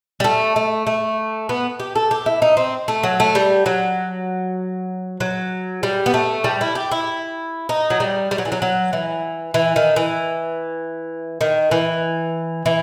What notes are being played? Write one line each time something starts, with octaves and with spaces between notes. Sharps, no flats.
G3
A3
A3
A3
B3
G4
A4
G4
E4
D#4
C4
A3
F#3
A3
G3
F#3
F#3
G3
B3
A3
G3
E4
G4
E4
D#4
F#3
G3
G3
F#3
E3
F#3
F#3
E3
E3
D#3
E3
D#3
E3
E3